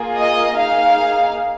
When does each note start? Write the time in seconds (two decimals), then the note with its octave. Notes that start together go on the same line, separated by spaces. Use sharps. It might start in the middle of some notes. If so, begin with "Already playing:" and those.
Already playing: A#3 F4 G#4
0.19 D#5
0.58 A#3 D#4 G#4 F5